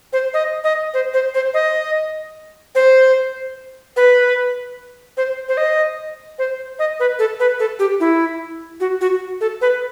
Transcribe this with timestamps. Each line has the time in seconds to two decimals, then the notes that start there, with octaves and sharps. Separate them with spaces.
0.13 C5
0.34 D#5
0.64 D#5
0.94 C5
1.14 C5
1.34 C5
1.54 D#5
2.75 C5
3.97 B4
5.17 C5
5.49 C5
5.57 D#5
6.39 C5
6.79 D#5
7.00 B4
7.19 A4
7.40 B4
7.60 A4
7.79 G4
8.00 E4
8.80 F#4
9.01 F#4
9.41 A4
9.61 B4